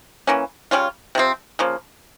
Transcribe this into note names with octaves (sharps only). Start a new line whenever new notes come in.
E3 A#3 C#4
C#3 G3 C#4 F4
C3 F3 C4
C#3 F3 A#3